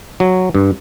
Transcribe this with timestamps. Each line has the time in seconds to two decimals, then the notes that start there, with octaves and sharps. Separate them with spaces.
0.20 F#3
0.55 G2